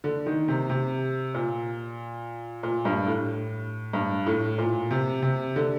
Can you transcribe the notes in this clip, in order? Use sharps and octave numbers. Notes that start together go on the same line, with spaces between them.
D3
D#3
C3
C3
A#2
A#2
G2
A2
G2
A2
A#2
C3
C3
D3